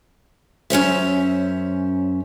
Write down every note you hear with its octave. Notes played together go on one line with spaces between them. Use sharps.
F#2 C#4 C5 E5